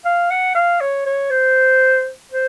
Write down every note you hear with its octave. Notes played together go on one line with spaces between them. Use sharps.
F5
F#5
F5
C#5
C#5
C5
C5